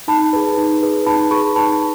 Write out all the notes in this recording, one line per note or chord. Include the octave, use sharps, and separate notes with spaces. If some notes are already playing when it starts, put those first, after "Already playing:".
D#4 A5 B5
G#4 B4
D#4
G#4 B4
D#4 A5 B5
G#4 B4 B5 C#6
D#4 A5 B5